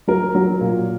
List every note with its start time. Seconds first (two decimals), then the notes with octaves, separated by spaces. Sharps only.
0.08 F#3 A#4
0.35 F#3
0.61 A#2